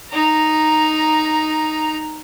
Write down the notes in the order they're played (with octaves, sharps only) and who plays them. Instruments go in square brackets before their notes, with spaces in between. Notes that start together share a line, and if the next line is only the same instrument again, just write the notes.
[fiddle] D#4 A#5